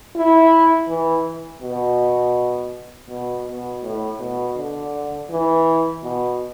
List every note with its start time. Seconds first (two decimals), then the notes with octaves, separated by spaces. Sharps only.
0.15 E4
0.88 E3
1.62 B2
3.09 B2
3.46 B2
3.83 A2
4.20 B2
4.56 D3
5.30 E3
6.03 B2